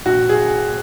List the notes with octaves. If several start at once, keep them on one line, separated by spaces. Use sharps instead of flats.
A#1 F#4
G#4